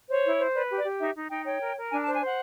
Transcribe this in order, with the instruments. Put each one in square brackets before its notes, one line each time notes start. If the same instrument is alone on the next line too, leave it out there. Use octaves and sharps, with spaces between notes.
[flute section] C5 C#5
E4
C5
B4 D5
G4
D5
G4
D#4 E5
D#4
D#4 G5
C#5 G5
A#4
A#4
D4 G#5
A5
C5
G#5
C5 F#5